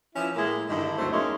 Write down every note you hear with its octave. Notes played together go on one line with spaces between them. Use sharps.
E3 F3 C#4 E4
A2 G#3 A#3 E4
G2 D3 D#3 E4
D2 F#3 A3 C4 D4 C5
E2 G#3 A#3 C#4 D#4 E5